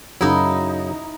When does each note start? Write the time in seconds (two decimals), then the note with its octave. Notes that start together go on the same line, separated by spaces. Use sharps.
0.21 F#2 C#3 F#3 D#4 E4